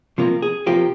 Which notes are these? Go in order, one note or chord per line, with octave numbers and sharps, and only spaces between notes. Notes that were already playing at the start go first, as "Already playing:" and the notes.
C3 F3 A#3
G#4
C3 F3 A#3 G4